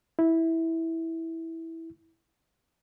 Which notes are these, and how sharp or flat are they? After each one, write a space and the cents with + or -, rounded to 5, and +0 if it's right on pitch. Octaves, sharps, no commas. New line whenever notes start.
E4 -10